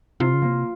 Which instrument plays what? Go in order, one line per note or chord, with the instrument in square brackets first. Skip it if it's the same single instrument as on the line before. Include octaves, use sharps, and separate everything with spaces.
[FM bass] C3 [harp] F4
[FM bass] C#3
[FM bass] C3 [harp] A#3